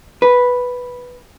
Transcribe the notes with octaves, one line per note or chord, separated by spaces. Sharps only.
B4